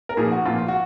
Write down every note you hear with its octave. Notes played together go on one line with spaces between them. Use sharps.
A#4
A#2 F3 G#4
F#4
A#2 F3 F4
F#4